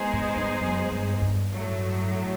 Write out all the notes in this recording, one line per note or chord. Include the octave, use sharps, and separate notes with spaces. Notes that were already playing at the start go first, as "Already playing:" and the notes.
Already playing: G#3 B3 D#4 G#4 C5
G#2
G2
F#2
G2
G2
A2 F#3 A3